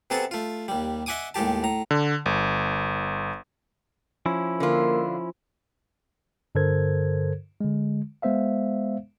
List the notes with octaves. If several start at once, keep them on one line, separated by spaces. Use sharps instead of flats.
C3 B3 G#4 A4 A5
A3 F4
D#2 G3
D#5 E5 F#5 G#5 D6 D#6
D#2 A2 G#3 G4 A5
A2 A#5
D3
G1
F3 C#4 E4
D3 A#3 F4
G2 D3 A4 A#4 C5 G#6
D3 G#3
G#3 B3 C5 E5 F5